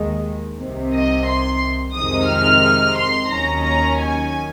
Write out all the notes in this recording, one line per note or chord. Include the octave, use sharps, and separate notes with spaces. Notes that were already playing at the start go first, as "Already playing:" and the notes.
Already playing: D#2 D#3 G#3
C2 C3 D#3
D#5
C6
F2 C3 D#3 G#3 D#4 D#6
F6
C6
D#2 D#3 F#3 C#4 A#5
A#5
G#5